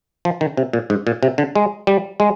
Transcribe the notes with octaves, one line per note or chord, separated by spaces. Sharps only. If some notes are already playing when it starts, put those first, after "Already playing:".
F3
D#3
C3
A#2
G#2
A#2
C3
D3
G#3
G3
G#3